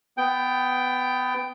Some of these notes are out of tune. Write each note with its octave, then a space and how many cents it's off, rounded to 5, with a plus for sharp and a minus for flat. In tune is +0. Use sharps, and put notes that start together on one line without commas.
B3 +20 G5 +0